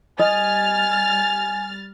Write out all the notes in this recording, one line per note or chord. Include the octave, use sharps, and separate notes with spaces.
G3 D#5 G#5 F6 A6